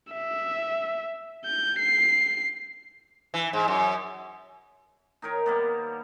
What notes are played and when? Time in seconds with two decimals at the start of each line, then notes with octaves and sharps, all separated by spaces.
0.12 E5
1.45 G6
1.79 C7
3.34 E3
3.53 G#2
3.68 F#2
5.22 D#3 D#4 A#4 C#5
5.46 G3 A#3 B3